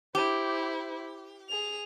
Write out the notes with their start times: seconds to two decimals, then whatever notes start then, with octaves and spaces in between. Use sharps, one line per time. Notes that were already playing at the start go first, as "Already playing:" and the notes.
0.15 E4 G4 C5
1.49 G#4 F7